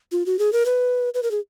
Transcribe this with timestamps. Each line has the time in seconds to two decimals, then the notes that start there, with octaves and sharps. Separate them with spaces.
0.12 F4
0.26 F#4
0.39 G#4
0.53 A#4
0.66 B4
1.14 B4
1.23 A#4
1.31 G#4